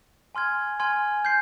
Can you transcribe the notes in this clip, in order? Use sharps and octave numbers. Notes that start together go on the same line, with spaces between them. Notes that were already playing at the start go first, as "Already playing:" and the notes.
G#5 C6 F6 G#6
G#5 C6 F6 G#6
G6 C7